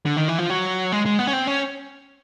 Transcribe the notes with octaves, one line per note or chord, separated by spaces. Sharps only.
D3
D#3
E3
F3
F#3
G#3
G#3
B3
C#4
C4
C#4